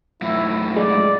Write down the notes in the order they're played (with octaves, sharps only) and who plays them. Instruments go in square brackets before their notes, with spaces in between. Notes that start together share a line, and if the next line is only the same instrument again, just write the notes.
[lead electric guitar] F#2 A2 [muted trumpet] E4
[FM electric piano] G#3 [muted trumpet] D5